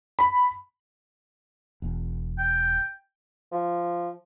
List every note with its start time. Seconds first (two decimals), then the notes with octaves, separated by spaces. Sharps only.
0.19 B5
1.82 E1
2.38 G5
3.52 F3